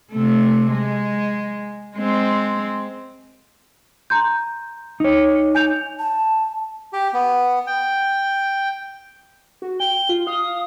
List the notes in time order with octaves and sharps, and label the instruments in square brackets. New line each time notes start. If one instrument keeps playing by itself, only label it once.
[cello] C3 A3
G#3
G#3 C4
[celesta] A#5 C6 G6
[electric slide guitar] D#4 C#5
[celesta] G#5 G6 F7
[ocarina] A5
[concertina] G4
B3
G5
[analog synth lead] F#4
[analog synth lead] G5 [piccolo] G7
[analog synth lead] F4
[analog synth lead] F5 [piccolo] D#6